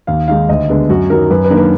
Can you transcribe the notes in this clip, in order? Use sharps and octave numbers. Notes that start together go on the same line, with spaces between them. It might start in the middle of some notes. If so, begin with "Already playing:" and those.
D#2 F5
D#3 G#3 D#4 F5
D2 D#5
D3 G#3 B3 D4
F#2 F#4
D#3 F#3 A#4
F#2 B4
B4
D#3 A#3 D4
B4